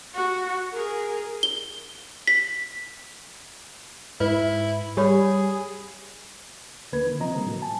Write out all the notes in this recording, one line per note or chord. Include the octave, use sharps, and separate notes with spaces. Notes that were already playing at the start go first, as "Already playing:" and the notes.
F#4
G#4 A#4
G7
B6
G#2 E4 B4
G3 G4 G#4 C#5 B5
D2 D3 A#3 B4 G#6
D#3
C3 F3 C4 D#5 A#5
D3 G3 A#3
A2 F#3
G#5 A5